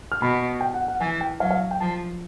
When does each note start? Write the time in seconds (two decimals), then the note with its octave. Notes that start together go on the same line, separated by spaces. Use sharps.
0.12 F6
0.21 B2 B5
0.61 G5
0.74 F#5
0.88 F#5
1.00 E3 G#5
1.21 G5
1.40 F#3 F5
1.51 F5
1.71 G5
1.81 F3 A5